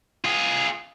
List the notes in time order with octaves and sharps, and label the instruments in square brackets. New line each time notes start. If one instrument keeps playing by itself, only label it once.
[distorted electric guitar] F4 G#4